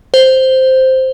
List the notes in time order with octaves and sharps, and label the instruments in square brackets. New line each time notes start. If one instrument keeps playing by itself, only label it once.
[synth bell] C5